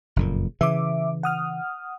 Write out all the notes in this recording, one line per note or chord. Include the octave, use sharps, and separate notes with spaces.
F#1 F2 A#2
C#3 E3 E5 D6
F#5 D#6 F6